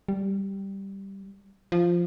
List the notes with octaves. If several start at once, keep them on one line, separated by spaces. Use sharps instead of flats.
G3
F3